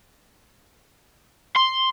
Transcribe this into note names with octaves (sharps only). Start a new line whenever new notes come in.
C6